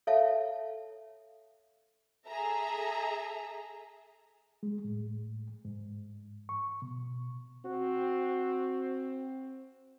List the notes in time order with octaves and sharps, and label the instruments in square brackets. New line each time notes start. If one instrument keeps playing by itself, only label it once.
[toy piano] A4 C#5 E5 F5 A5
[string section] G#4 A4 E5 A#5
[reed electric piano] G#3
A2
G#2
C#6
B2
[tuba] C4 [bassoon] F#4